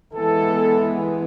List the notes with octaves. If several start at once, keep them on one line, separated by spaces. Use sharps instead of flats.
E3 G#3 B3 A4